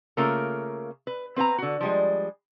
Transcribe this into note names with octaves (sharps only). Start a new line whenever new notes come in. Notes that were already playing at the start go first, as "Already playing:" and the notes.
C#3 A3 A#3 F4 A#4
B4
C4 B4 G5 A#5
D3 F#4
F3 G3 G#3